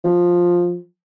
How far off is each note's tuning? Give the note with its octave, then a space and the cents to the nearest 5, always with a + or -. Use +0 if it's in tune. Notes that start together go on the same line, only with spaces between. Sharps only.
F3 +10